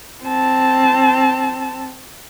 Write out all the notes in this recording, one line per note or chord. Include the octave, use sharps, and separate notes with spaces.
C4 A5